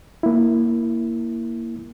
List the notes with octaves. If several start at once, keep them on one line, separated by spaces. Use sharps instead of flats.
A#3 E4